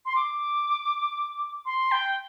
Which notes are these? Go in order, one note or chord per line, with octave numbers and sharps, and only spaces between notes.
C6
D6
C6
G5